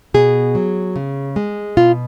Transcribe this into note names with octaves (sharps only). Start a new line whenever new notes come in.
B2 G#4
F#3
C#3
G#3
B2 F4